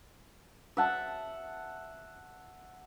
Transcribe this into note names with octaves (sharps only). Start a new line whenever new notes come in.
E5 F#5 A5